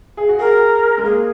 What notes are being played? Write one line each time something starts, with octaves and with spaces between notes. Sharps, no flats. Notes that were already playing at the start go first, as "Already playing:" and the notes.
G#4
F#4
G#4 A#4
G#3
A#3 G#4